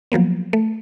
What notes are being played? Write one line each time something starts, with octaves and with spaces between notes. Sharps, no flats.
F3 F#3 A#3 B3
A3